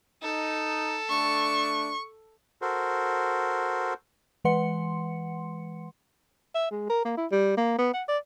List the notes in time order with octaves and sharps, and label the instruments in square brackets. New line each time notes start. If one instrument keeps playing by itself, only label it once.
[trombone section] D#4 [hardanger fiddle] A4
[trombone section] A3 D4 [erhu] C#6
[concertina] F#4 A4 A#4 C5
[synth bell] E3 G#3 B4 F#5 C6 C#7
[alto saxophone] E5
G#3
A#4
A#3
E4
G3
A#3
B3
F#5
D5